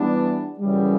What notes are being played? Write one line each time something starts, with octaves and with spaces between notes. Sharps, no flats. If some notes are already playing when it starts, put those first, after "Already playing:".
Already playing: E3 G3 B3 D4
F#2 C#3 E3 G3